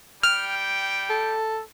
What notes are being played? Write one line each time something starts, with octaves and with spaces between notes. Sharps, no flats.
G3 G5 F6
A4